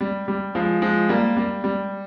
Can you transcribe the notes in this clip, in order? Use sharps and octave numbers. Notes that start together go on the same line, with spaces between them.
G3
G3
F3 G#3
F3 G#3
G3 A#3
G3
G3